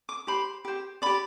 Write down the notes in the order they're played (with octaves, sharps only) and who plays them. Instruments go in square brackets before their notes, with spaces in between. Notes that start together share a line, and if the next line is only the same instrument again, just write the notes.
[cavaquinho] D6
G4 C5 B5
G4 C5
G4 D5 B5